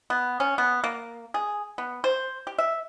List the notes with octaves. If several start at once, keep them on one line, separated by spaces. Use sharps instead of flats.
B3
C#4
B3
A#3
G#4
B3
C5
G4
E5